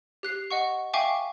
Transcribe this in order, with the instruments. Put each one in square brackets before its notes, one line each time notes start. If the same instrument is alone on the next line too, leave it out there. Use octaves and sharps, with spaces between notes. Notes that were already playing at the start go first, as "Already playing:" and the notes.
[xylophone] G4 F#6 C7
D#5 F#5 C#6
E5 F5 G5 G#5 C#6 D6